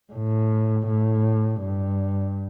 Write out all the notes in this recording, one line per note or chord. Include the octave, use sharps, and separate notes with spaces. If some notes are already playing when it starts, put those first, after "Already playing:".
A2
A2
G2